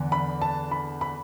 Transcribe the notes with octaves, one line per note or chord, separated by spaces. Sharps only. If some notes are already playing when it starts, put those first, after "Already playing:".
Already playing: E2 D3
B5
A5
B5
B5